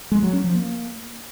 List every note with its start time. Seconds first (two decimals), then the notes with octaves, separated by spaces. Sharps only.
0.12 G#3
0.22 F#3
0.33 C#4
0.44 F3
0.55 A#3